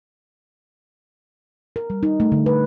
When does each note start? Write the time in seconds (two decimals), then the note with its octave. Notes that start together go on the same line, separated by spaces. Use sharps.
1.76 A#4
1.90 G3
2.03 D#4
2.20 A3
2.32 D3
2.46 B4